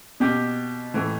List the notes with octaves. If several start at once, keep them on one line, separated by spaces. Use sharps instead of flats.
B2 G4
A2 E3